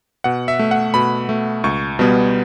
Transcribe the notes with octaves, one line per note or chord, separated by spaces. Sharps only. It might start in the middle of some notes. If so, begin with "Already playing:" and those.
B2 F#5
E5
A3
F#5
B2 B5
A3
C#2 C#6
B2 G3 B3